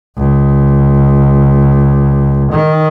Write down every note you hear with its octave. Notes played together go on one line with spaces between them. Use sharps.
C#2
D#3